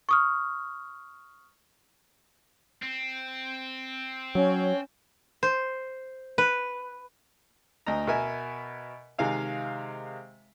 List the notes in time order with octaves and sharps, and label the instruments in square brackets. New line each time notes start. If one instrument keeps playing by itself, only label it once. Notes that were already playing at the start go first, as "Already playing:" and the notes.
[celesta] C#6 D#6 F6
[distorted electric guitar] C4
[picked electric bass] F#3 [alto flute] C#4 [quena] C#5
[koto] C5
B4
[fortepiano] D2 D#5 A#5
B2 A#4 E5 G#5
C3 D#3 G#3 F5 G#5